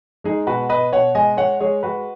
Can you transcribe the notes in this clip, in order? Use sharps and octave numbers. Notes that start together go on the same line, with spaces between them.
G#3 D#4 G#4
B2 F#4 B4
B2 B4 D#5
B2 C#5 F#5
G#3 D#5 G#5
G#3 C#5 F#5
G#3 G#4 C#5
G#3 F#4 B4